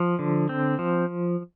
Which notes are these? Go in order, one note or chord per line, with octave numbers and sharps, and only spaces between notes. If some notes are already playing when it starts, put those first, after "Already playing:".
Already playing: F3
D3
C4
F3